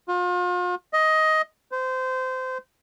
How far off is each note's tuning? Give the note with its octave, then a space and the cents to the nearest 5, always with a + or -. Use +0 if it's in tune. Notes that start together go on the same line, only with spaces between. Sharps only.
F4 +40
D#5 +15
C5 -25